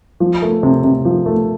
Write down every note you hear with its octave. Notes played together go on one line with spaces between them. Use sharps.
F3
A3
C3
C3
F3
A3